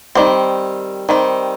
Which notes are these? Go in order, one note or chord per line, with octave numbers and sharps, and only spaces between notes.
D#3 G3 C4
D#3 G3 C4